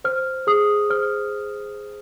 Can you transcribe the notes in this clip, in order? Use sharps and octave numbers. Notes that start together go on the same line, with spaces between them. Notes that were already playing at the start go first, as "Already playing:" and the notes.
C5 F6
G#4 D#6
C5 F6